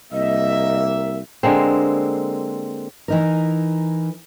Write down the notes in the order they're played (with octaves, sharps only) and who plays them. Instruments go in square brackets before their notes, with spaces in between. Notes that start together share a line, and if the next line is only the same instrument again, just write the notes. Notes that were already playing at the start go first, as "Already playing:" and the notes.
[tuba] C2 [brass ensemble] A#3 E5 [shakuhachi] D#5
[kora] D3 G#3 A#3 C4
[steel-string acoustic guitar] E3 D#4 A#4